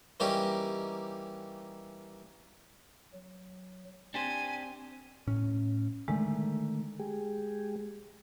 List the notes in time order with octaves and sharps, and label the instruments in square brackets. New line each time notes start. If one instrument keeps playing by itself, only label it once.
[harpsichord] E3 G3 A#3 C#4 D#4 G4
[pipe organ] F#3
[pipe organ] C4 [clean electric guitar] D4 G4 C5 [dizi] G#5
[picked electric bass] A2 C#4
[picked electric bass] D3 D#3 A3 [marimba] G#3
[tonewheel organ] G#3 G4 G#4